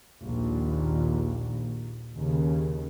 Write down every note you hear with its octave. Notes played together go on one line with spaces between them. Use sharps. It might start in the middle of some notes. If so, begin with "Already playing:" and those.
A#1 D#2 A#2
D#2 C#3